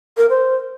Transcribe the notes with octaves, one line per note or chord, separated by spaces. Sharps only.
A#4
C5